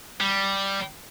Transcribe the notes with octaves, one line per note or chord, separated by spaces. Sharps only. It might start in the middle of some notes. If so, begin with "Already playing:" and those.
G3